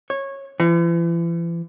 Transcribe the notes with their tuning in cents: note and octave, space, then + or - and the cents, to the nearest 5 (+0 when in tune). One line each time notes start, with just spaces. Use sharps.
C#5 -15
E3 +40